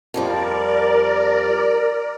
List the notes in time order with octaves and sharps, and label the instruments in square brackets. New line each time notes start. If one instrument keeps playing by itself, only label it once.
[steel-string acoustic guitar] F2 F3 G3 [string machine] A#4 D5